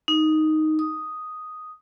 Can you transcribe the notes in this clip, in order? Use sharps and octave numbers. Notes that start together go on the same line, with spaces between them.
D#4
D#6